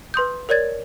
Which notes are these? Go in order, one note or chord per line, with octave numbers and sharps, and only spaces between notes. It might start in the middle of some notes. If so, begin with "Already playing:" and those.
B4 C6 D#6 G6
A#4 C#5 D5 G#6 A6